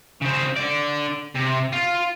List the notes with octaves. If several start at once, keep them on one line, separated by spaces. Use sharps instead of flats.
C#3 C4
D3 D5
C3
F4